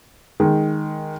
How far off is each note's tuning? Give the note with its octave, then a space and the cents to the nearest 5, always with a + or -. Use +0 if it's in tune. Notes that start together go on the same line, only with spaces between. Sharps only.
D#3 +0 G#3 +0